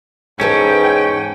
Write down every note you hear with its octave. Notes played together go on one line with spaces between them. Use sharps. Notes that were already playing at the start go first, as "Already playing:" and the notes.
E2 G#2 C#4 A4 B4 G5